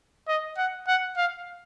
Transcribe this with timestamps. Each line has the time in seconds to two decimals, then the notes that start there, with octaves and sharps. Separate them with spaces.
0.28 D#5
0.58 F#5
0.87 F#5
1.17 F5